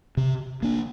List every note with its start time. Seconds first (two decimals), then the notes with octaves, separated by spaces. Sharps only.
0.17 C3
0.62 A#3 D4